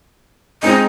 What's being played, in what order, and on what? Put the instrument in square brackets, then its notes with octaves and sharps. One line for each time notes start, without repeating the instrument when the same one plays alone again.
[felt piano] G#3 C4 D#4 [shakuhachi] D#5